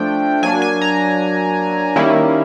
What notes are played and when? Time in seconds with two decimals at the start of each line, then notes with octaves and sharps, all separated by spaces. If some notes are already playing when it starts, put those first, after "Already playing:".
Already playing: F3 A3 D4 G5
0.43 F#3 A#3 D4 G#5
0.62 G#5
0.81 A#5
1.96 D#3 G3 A#3 C#4 E4